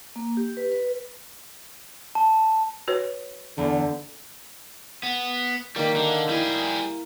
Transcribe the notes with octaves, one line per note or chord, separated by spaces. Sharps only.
A#3
G4
B4
B4
A5
F#4 B4 C#5
E2 D3
B3
D#3 G3 A#3
D3 F5
G3 E4 G#4 A#4